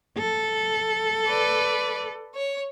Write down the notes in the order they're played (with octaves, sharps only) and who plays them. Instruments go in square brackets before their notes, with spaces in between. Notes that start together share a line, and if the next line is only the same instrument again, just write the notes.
[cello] A4
[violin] B4 D5
C#5